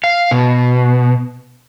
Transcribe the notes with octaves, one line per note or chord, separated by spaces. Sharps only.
F5
B2